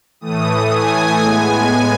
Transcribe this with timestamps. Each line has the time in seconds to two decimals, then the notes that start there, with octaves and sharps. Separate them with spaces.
0.21 A2 E3 A3 D#6
0.70 G#5
1.19 A2 G#3 B3